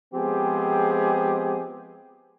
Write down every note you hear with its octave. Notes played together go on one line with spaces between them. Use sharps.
F3 G#3 B3 C4 G4 G#4